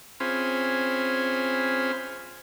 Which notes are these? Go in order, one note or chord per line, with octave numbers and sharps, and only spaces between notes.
C4 C#4 F4 G#4 C5 B5